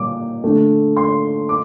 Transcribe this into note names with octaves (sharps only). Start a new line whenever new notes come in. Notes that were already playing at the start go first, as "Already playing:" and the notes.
Already playing: A#2 G3 A#3 D6
D3 A3
C6
D6